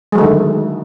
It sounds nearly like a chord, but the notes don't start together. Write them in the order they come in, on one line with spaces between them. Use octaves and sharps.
G#3 F#3 A3 D3 D#3